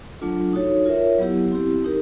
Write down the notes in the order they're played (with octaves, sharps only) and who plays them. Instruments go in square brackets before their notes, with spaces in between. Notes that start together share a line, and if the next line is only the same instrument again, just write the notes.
[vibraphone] F#3 A3 D4 F4 A4
D#4 F#4 A4 C#5
F4 A#4 C#5 E5
F#3 B3 E4 G4
C4 E4 G4
D#4 G4 A#4